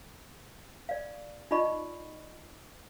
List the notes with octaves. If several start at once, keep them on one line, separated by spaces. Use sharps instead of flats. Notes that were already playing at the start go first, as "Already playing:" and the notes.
D5 F5
D#4 F4 D5 D#5 B5 C#6